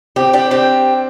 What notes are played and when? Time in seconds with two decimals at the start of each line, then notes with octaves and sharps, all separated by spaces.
0.16 C4 G4
0.33 D4 G4
0.51 C4 G4